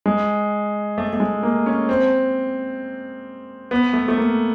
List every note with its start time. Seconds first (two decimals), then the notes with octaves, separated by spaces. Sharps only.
0.06 G#3
0.98 A3
1.13 A3
1.20 G#3
1.43 A#3
1.66 C#4
1.89 C4
3.71 B3
3.93 A3
4.08 A3
4.17 A#3